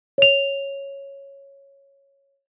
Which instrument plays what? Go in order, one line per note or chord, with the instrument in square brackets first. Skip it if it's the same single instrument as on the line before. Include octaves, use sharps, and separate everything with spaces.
[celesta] C#5 F7